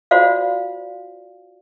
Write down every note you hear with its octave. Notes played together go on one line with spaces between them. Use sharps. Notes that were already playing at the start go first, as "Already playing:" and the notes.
F4 F#4 C5 D5 F5